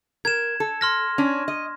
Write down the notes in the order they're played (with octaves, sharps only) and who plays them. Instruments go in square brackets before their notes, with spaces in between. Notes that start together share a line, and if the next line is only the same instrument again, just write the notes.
[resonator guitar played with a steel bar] A#4 [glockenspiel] G#6 E7
[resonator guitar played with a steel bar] A4
[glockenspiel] C6 F6 A#6
[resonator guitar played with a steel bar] C#4 D4
D#5